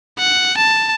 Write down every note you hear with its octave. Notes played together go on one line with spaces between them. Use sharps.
F#5
A5